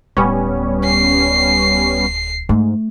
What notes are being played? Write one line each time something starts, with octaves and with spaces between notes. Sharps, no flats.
D1 G3 B3 C#4
C7
G#2 A3